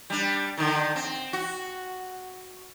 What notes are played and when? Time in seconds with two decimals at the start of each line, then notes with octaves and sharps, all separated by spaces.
0.10 G3 D4
0.58 D3 D#3
0.96 C4
1.33 F#4